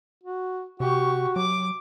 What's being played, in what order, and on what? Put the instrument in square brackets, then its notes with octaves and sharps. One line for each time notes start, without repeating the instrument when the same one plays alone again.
[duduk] F#4
[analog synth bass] C3 [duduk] F#4 [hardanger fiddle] G4 C#6
[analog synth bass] F#3 [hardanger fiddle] D6